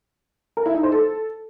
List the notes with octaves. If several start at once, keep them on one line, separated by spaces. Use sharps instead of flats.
A#4
E4
D#4
C5
A4